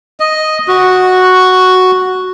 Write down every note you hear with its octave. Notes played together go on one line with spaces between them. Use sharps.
D#5
F#4